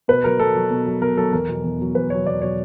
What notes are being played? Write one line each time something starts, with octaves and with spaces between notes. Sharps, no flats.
B2 B4
F#3 A#4
B2 A4
F#3
B2
F#3
B2 A#4
F#3 A4
E2 A#4
B2 F#3
E2
B2 F#3
E2 B4
B2 F#3 C#5
E2 D5
B2 F#3 C#5